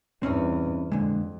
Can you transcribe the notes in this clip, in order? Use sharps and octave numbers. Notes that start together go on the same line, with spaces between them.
E2 G2 C4 C#4 D#4
F2 A#2 D3 G#3